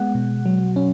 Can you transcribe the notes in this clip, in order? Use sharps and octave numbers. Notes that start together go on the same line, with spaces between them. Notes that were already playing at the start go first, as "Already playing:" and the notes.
Already playing: G#3 B3 F#5
B2
F#3
C#4